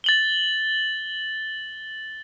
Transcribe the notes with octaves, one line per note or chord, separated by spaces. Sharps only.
A6 F#7 G7